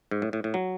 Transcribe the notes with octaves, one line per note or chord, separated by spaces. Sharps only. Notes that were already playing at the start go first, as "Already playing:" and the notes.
G#2
A2
A2
A2
F#3